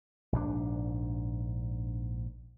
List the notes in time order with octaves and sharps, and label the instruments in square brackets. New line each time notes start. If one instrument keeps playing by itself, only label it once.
[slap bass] A#1 G#2 D4